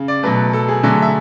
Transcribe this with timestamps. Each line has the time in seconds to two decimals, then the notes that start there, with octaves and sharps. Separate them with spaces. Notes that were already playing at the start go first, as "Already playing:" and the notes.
Already playing: C#3
0.08 D5
0.23 B2 F#3 A3 B4
0.53 A4
0.68 G#4
0.83 D3 F#3 A3
1.02 E5